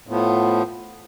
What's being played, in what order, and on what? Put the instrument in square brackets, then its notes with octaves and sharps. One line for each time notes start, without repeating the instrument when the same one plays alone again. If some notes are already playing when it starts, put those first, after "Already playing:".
[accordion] A2 F3 B3